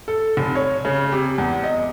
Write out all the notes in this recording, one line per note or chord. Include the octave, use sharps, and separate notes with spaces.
A4
F1
C#5
C#3
C3
E2
D#5